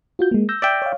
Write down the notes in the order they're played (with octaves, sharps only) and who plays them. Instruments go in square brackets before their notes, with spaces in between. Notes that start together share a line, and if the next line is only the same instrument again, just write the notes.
[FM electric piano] F4 F#4 G6
G#3 A#3
E6 G6 A#6
[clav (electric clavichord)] D5 E5 G5
[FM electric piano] C#5 F5